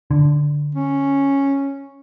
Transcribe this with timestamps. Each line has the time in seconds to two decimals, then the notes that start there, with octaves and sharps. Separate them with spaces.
0.11 D3
0.75 C#4